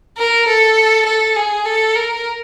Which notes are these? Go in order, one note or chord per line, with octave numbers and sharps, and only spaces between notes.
A#4
A4
A4
G#4
A4
A#4